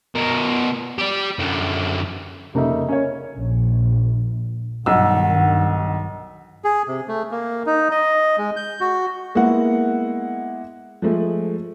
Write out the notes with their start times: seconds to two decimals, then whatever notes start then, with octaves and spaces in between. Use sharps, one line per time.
0.15 B2 A#4
0.98 G4 D5
1.39 F#2 D3
2.54 F1 C#3 A#3 D#4 A4 E5
2.88 C#4 A#4 C#5
3.36 A#1
4.86 B1 G2 D#3 F#5 E6
6.64 G#4
6.88 C3
7.08 A3
7.31 A#3
7.66 D#4
7.91 D#5
8.38 G#3
8.56 G6
8.81 F#4
9.35 G#3 A#3 B3 E4 F#5
11.02 F3 G#3 A3